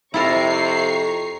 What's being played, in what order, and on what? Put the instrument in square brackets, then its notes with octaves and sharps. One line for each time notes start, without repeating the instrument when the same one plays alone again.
[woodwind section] F2 [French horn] C3 [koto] E4 A4 A#4 [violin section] A#5 C#6 C7